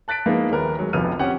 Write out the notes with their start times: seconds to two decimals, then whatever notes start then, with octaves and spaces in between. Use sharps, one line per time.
0.08 A5 F#6 A6 B6 D7
0.26 F3 G#3 A#3 B3 D#4 E4
0.51 D#1 A#4 B4
0.79 F#3 G#3
0.93 F1 A#1 F3 B3 F6 D#7
1.19 C4 C#4 G4 F#5